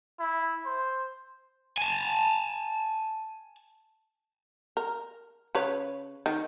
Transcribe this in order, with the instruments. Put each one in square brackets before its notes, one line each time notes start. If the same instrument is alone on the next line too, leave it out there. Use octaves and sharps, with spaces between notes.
[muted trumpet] E4
C5
[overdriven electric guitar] G#5 A5
[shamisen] A#4
C#3 B4 C#5
D#3